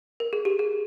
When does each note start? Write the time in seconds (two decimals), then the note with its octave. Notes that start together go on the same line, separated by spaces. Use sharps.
0.20 A#4
0.33 G#4
0.45 G4
0.59 G#4